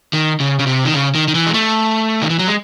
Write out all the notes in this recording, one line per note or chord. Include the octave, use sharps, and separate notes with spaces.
D#3
C#3
C#3
C3
D#3
C#3
D#3
D#3
E3
G#3
A3
D#3
E3
F#3
G#3